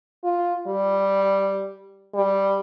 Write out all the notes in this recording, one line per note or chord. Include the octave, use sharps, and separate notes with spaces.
F4
G3
G3